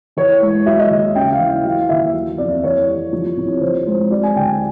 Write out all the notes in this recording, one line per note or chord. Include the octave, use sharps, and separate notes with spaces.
E3 C#5
G#3
F#3 E5
D#5
D#2
C#3 G5
F5
E3
F5
F#3 F5
D#2 E5
F#3
F2 D5
E3 C#5
G3
F3
C2
F3 C5
G#3 C5
F#3 D5
G#5
D2 G5
G#5